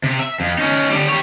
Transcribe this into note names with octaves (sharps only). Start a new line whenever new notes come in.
C3
E5
F2
C#4 D#4
D3 G3
G4 C#5